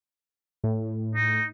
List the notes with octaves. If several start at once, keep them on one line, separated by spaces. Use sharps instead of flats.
A2
D#4